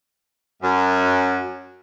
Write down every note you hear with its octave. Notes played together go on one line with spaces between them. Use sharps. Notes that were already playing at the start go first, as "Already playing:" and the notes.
F#2